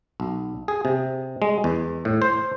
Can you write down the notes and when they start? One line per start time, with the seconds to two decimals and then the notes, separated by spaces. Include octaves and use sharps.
0.20 B1
0.68 G#4
0.85 C3
1.42 G#3
1.64 E2
2.05 A2
2.22 C5